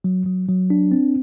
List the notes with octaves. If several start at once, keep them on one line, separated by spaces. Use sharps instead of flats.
F#3
F#3
F#3
D4
C4